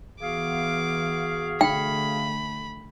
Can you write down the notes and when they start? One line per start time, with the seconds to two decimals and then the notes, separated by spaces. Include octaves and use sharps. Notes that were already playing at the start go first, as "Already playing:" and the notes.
0.21 E3 B3 F#4 G#4 F5 D6
1.61 D3 A3 G5 B5